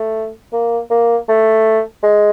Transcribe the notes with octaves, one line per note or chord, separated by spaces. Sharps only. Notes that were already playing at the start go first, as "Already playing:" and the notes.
Already playing: A3
A#3
A#3
A3
G#3